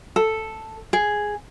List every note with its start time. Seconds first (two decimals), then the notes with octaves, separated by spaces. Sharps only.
0.16 A4
0.93 G#4